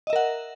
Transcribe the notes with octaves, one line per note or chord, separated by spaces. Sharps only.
A#4 D#5 E5 F#5